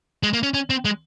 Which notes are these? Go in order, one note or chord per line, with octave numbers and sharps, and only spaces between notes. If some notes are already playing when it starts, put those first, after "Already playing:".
G#3
A#3
C#4
C#4
C4
G#3